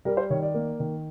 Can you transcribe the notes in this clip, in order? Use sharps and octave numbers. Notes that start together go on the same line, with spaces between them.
G3 A#4
C5
D#3 C#5
D5
A#3
D#3